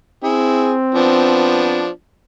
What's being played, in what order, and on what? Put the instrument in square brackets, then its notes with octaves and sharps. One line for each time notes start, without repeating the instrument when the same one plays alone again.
[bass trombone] C4 [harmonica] E4 G#4
[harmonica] F3 B3 D4